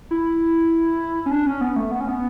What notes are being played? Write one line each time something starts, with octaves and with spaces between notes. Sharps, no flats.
E4
C#4
D4
C#4
B3
A3
B3
C#4
B3